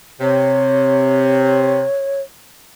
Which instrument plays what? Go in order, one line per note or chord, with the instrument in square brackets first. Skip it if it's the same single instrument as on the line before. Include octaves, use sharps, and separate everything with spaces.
[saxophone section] C3 [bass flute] C#5